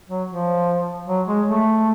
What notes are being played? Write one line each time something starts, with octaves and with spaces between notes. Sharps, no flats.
F#3
F3
F#3
G#3
A3